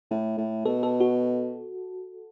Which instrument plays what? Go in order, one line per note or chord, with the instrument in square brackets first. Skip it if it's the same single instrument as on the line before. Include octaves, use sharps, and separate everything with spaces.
[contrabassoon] A2
A2
[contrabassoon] B2 [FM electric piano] A4
[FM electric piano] A4
F#4